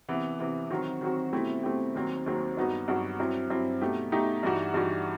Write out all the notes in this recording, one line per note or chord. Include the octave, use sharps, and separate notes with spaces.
C3 E3 B3
C3 E3 B3
D#3 F#3 C4 F#4
D#3 F#3 C4 F#4
B2 A3 C4 E4 G4
B2 A3 C4 E4 G4
D#2 D#3 F#3 C4
D#2 D#3 F#3 C4
G2 F#3 B3 D#4 F#4
G2 F#3 B3 D#4 F#4
G2 F#3 C4 E4
G2 F#3 C4 E4
B2 A3 D#4 G4
B2 A3 D#4 G4
G2 E3 G3 D#4 F#4
G2 E3 G3 D#4 F#4